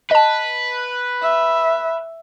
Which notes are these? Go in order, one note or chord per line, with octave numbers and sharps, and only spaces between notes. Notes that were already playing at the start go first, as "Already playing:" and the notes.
B4 D#5 A5
E5